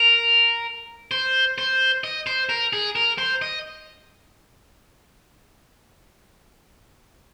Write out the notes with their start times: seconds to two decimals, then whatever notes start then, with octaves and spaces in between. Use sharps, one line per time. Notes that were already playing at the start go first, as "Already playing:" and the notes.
Already playing: A#4
1.11 C5
1.58 C5
2.04 D#5
2.27 C5
2.49 A#4
2.73 G#4
2.96 A#4
3.18 C5
3.42 D#5